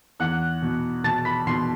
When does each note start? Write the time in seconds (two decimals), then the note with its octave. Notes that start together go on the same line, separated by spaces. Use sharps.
0.20 E2 F#5 F#6
0.62 B2
1.04 B2 A5 A6
1.25 B5 B6
1.47 B2 C6 C7